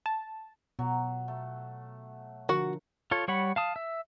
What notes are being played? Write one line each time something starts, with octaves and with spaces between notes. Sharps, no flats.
A5
B2 F#3
A3
D3 F3 F#4 A#4 F#5
F4 A4 C#5
G3 C#5 F#5 B5
F5 A5 D#6
E5